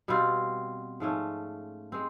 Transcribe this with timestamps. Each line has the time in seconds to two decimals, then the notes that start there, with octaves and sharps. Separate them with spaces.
0.08 B2 G3 C4 F4
1.00 G#2 F3 A3 C#4
1.92 G#3 C4